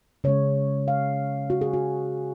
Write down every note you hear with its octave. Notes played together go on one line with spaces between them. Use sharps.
C#3 G#3 C#4 C#5
F5
F#4
G#4
F#4